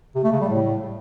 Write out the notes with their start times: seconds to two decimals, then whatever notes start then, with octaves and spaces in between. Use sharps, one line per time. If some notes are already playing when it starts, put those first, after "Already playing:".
0.15 C3
0.24 A3
0.32 C#3
0.41 G3
0.49 A2